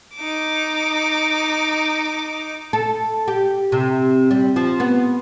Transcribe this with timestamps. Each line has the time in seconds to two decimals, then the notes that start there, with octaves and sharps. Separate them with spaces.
0.16 D#4 D6
2.73 A4
3.28 G4
3.72 C3
4.31 G3
4.56 F3
4.80 B3